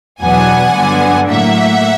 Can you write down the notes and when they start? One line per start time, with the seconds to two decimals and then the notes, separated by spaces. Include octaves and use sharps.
0.21 E2 B2 F#3 B3 D4 F#5 G#5
0.75 G2 D3 F#3 B3 D4
1.29 A2 F#3 A#3 E5 F#5